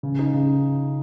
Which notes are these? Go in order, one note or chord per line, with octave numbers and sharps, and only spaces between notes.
C#3
D#4
C#3